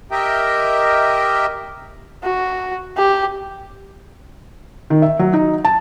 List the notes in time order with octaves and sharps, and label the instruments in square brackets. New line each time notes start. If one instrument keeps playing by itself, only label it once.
[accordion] G4 A#4 D#5 E5 G5
[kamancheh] F#4
G4
[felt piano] D#3
E5
F#3
D#4
A5